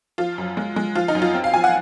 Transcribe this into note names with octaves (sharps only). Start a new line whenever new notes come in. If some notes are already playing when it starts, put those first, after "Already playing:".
F3 F4
F#2
G#3
G#3
F3 F4
D#4
F#2
F4
C4
F5
F3 G#5
F#5